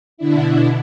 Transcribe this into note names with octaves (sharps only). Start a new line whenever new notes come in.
B2 D3 D4 E4